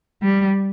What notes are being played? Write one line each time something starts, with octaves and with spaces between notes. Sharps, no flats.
G3